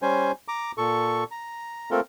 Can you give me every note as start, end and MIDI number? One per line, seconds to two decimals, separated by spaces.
0.02 0.32 55
0.02 0.32 61
0.02 0.32 72
0.02 0.32 80
0.48 0.72 82
0.48 0.72 86
0.78 1.24 46
0.78 1.24 69
0.78 1.24 85
1.31 1.90 82
1.91 2.00 57
1.91 2.00 58
1.91 2.00 60
1.91 2.00 65
1.91 2.00 69
1.91 2.00 70